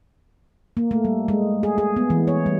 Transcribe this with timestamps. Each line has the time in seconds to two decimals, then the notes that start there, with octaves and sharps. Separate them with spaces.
0.77 A#3
0.91 A3
1.05 G3
1.28 G#3
1.63 G#4
1.78 G#4
1.96 B3
2.10 E3
2.28 C#5
2.46 G3